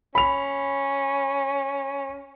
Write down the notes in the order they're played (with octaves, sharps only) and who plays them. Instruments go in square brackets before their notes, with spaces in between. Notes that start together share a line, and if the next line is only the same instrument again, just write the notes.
[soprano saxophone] C#4 [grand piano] B5 F7